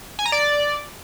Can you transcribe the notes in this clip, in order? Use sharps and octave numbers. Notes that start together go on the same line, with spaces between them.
G#5
A#5
D5